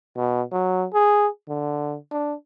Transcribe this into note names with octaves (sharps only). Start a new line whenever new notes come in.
B2
F#3
G#4
D3
D4